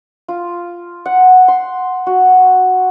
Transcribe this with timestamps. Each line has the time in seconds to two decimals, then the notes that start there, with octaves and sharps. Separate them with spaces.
0.28 F4
1.06 F#5
1.48 C6
2.07 F#4